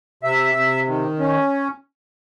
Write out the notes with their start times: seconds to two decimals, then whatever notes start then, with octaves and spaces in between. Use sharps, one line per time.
0.23 C3 E5
0.55 C3
0.88 D#3
1.19 C#4